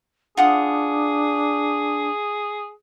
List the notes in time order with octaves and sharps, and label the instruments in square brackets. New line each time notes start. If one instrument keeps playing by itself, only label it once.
[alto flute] D4 [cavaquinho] F4 F#5 D#6 [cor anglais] G#4